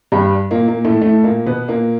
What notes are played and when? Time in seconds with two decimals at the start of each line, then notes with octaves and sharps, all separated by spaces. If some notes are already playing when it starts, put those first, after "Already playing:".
0.12 G2 G3
0.51 A#2 A#3
0.68 A#2 A#3
0.85 A2 A3
1.02 A2 A3
1.24 A#2 A#3
1.46 B2 B3
1.68 A#2 A#3